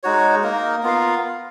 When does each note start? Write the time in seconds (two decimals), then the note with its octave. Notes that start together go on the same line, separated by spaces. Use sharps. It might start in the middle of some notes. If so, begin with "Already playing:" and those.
0.03 G#3 D#4 F#4 C#5
0.43 A#3 D#4 A#4
0.83 B3 F4 A#4 F5